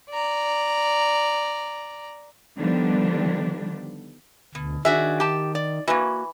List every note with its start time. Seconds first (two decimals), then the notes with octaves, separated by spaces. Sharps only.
0.11 D5 A#5
2.55 D3 D#3 F3 G3 B3 D4
4.55 D2 B2
4.85 D#3 D4 F#4 G#4 E5
5.20 G4 A5
5.55 D5
5.88 E3 A#3 F#4